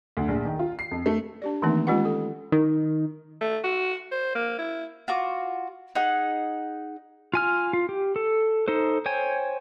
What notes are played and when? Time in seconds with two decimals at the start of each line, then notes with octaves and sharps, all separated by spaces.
0.17 D2
0.28 A#1
0.45 D#3
0.59 F4
0.79 C7
0.91 F2
1.06 A3
1.42 D4 G4 D5
1.62 D#3 E3 A3 A#3 C4 D#4
1.87 G#3 C#4 F4 G4 B4 F#5
2.05 A4
2.52 D#3
3.41 A3
3.63 F#4
4.11 C5
4.35 A#3
4.58 E4
5.08 F4 F#4 D6
5.95 D#4 G#4 F#5
7.34 F4 G#5 F6
7.73 F4
7.89 G4
8.16 A4
8.68 D#4 A4 C5
9.06 C5 C#5 G5 G#5